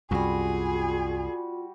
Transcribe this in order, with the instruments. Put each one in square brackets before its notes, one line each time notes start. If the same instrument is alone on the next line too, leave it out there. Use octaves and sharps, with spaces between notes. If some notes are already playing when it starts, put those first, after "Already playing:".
[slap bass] C2 F#2 [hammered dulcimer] G3 F#4 [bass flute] F4 [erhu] G#4